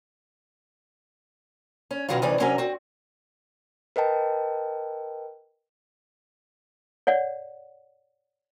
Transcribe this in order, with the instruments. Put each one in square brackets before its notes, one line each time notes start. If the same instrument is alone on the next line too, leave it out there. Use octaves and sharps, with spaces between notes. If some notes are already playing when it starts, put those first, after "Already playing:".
[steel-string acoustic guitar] C#4
B2 D#3 F#3 B3 C#4 F4
D2 C3 E3 C#4 D#4 D5
C3 F#3 C#4 D4 A#4 G#5
C4 F#4
[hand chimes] A#4 B4 D#5 G5 A5
[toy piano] C#5 D5 F#5